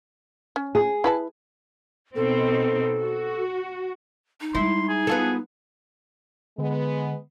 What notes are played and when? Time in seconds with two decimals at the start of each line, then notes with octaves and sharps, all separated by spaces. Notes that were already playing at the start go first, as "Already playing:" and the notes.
0.56 C#4
0.75 G#4
1.04 E4 B4 A5
2.16 B2 C4 D#4 A4
3.00 F#4
4.41 D#4
4.55 G3 G#3 E4 C6
4.89 G#4
5.07 B3 F4 A4
6.58 D3 G#3 B3